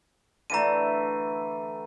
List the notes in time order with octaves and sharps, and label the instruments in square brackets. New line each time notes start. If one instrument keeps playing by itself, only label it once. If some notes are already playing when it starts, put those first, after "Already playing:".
[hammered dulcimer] D3 E3 A3 [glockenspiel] A#5 D#7